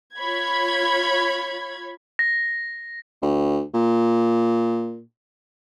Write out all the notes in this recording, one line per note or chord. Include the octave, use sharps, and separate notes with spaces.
F4 C#5 B5 G#6
A#6
D2
A#2